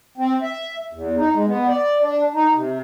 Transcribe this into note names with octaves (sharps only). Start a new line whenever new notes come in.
C4
E5
E2
D#4
G#3
B3
D5
D4
D#4
C3